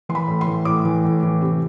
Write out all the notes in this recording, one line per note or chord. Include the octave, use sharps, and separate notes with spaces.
E3 C6
B5
A2
C6
E3
A2 D6
E3
A2
E3
C3